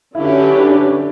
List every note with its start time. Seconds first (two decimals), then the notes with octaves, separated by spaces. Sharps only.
0.15 D3 F#3 C#4 E4 G4 B4
0.59 D4